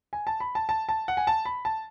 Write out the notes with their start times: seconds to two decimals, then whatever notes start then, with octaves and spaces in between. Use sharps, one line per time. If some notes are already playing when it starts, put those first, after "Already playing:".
0.13 G#5
0.27 A5
0.40 B5
0.55 A5
0.69 A5
0.89 A5
1.08 F#5
1.17 G#5
1.27 A5
1.45 B5
1.65 A5